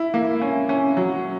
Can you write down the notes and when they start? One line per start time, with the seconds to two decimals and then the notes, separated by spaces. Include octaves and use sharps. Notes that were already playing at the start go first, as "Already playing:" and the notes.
Already playing: E4
0.14 A#3
0.42 C#4
0.69 C#4
0.97 F#3